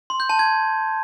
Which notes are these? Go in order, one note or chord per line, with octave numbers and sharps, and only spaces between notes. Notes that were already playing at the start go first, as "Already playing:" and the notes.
C6
G6
A5
G#6